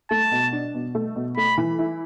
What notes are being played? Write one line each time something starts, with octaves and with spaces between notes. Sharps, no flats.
A3 A5
B2
D4
B2
A3
B2
A3 B5
E3
E4